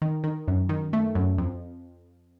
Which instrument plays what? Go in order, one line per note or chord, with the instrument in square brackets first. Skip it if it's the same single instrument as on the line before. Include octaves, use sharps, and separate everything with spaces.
[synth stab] D#3
D#3
F#2
D#3
A3
F#2
F2